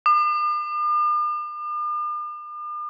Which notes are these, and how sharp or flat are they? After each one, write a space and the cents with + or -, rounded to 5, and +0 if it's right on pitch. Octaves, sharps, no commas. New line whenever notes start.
D6 +45